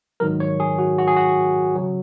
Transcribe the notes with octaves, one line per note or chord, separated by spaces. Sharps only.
G#1 G#2 D#3 F#3 A#4
C#5
G#4
F#4
F#4
G#4
F#4
C#3 F#3